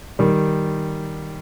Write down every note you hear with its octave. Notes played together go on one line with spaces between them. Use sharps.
D#3 G3